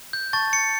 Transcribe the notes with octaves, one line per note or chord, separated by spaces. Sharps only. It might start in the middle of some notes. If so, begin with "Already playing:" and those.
G6
A5 C#6 G6 A6
C#7